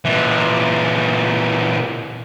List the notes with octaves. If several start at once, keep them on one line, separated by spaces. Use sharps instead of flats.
A#2 E3